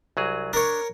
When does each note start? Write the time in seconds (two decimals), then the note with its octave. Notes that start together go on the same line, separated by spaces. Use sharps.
0.17 C2 F#3 G#4
0.53 D4 A#4 C#5